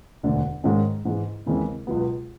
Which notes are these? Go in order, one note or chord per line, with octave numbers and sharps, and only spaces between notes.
E1 D2 D3
G#2 D#3 G#3 C#4
G#2 E3 G#3
D#2 C#3 E3 G#3 C4
C#2 B2 F#3 B3